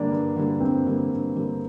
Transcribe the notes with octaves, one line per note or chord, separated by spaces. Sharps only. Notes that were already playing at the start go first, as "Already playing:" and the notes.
Already playing: G2 D3 G3 A#3 D4
G2
D3 G3 A#3
G2 C4
D3 G3 A#3
G2
D3 G3 A#3